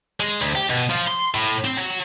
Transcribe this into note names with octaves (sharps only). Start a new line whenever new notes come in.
G#3
D2
G4
B2
F3
C6
A2
C4
F#3